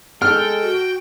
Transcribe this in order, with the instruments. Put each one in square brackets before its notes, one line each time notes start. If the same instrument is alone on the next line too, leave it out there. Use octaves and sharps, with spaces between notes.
[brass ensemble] G#3 A4 [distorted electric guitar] G5 [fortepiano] F6
[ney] F#4